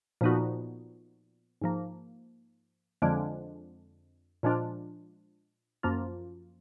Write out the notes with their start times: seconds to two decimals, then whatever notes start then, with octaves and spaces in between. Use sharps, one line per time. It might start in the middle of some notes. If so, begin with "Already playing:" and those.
0.21 A#2 F3 B3 D#4 F#4
1.62 G#2 F3 A#3
3.02 F2 D3 F3 G#3 D4
4.43 A#2 F3 G#3 D4 F4
5.83 F#2 F3 A#3 F4